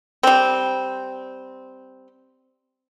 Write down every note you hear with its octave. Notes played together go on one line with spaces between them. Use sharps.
G3 C4